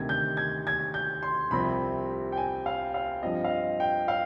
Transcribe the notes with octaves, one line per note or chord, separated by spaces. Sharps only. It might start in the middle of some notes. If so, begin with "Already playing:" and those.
Already playing: D2 C3 D#3 G#6
G6
G#6
G#6
G6
C6
C2 C3 F3 C4 B5
G5
G#5
F5
F5
G2 F3 C4 D#5
F5
D#5
G5
F5